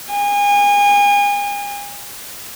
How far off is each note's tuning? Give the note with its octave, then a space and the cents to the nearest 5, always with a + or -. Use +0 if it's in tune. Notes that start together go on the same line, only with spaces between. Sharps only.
G#5 -35